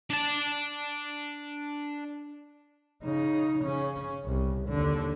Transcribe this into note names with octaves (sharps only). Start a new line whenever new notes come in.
D4 A5
C#3 D#4
C#3 C#4
C2
D#2 D3